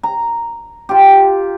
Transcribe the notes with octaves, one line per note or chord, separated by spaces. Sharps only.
A#5
F4 G4